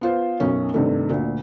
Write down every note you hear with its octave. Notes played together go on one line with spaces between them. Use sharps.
B3 F4 C5
B1 F#2 C#4
G2 C3 D#3 A3
D2 A#2